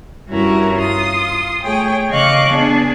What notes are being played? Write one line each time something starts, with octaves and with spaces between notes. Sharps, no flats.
G2 C#4 E4 F#4 A#4 A#5
F4 C6 D#6
A3 G#4 C#5 G5
C#3 D#5 F5 C#6 D6 F#6
B3 D4 G#4